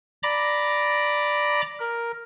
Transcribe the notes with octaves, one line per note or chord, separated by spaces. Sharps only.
D5 A#5 B5 D6 A#6
A#4